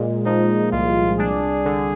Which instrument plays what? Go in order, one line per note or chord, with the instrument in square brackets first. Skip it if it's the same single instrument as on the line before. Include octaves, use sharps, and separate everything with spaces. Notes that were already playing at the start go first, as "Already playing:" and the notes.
Already playing: [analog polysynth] A#2 G#3
[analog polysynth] F3 [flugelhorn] D#4
[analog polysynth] C2 [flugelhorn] F4
[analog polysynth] D4 [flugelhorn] G#4
[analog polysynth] D3